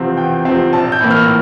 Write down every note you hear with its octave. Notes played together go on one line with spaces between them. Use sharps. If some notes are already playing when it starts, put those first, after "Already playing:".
Already playing: E2 C3 F3 C4 F5
E2 G5
C3 F3 C4
A#1 A5
G6
A2 E3 A#3
F6